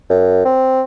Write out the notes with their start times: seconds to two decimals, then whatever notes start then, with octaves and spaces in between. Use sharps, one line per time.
0.10 F#2
0.45 C4